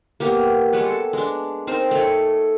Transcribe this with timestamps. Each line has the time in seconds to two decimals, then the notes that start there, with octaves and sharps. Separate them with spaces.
0.20 A#3 B3 G4
0.73 G3 G#3 B4 C#5
0.86 A4
1.13 G#3 D4
1.67 C4 D#4 A#4 C5
1.91 A3 C#5